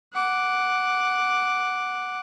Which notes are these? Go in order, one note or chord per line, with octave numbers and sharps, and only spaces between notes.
F#5 D6